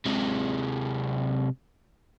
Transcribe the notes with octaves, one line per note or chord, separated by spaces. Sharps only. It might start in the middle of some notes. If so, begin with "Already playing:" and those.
C3 G#3